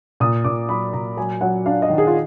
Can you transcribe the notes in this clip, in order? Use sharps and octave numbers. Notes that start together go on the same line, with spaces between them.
A#2 D#6
A#2 D6
F#3 B5
A#2 A#5
F#3 G#5
F#3 F#5
D4 F5
D#5
D#3
G#4
F4